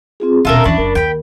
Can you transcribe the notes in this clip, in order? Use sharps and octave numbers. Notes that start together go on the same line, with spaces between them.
C4 F4 G#4
D#1 B2 C#4 F4 A4 A#4 E5
E2 E3 D4 B5 C#6
F#1 A#4
D#2 G5 B5